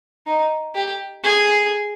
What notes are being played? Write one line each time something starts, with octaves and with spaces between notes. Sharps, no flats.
D#4
G4
G#4